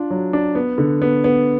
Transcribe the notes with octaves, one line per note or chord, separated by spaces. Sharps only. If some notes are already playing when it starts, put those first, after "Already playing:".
Already playing: D4 F4
F#3
D4
B3
D3
B3
B3